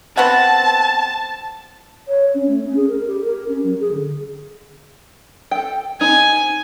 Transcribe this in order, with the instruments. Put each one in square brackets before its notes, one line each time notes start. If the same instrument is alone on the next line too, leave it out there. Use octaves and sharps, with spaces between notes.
[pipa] B3 C4 F#5 [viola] A5
[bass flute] C#5
C#4
A3
C#4
G#4
A#4
G4
A#4
C#4
F#3
G#4
D3
[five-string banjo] A4 G5
[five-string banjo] C4 D#4 [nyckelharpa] G#5